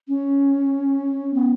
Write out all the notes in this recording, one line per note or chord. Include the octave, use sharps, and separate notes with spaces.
C#4
B3